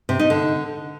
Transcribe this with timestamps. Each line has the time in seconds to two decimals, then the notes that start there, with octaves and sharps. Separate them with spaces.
0.09 C3
0.19 D#4
0.30 D3